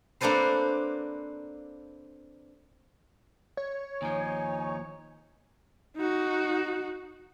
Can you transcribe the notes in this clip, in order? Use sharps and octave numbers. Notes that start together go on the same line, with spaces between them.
A#3 C4 D4 A4 B4 C5
C#5
D#2 F3 D#4 G#5
D#4 F#4